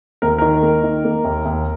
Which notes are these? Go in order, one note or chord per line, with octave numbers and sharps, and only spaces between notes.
D#2 A#4
D#3 A#4
A#3
D#3
A#3
D#2
D#2